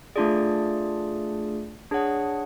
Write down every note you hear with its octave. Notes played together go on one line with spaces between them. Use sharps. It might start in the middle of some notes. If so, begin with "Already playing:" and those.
A3 D4 F4 G#4 D5
D4 G#4 C#5 F#5